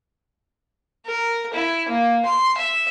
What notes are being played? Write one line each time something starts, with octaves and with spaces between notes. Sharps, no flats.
A#4
E4
A#3
C6
E5